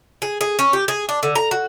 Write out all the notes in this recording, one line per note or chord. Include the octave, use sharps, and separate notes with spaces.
G#4
G#4
C#4
G4
G#4
D4
D3
A#5
F#4